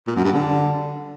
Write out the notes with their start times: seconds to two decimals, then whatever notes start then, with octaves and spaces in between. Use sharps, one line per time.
0.07 A#2
0.16 F#2
0.24 G2
0.32 D3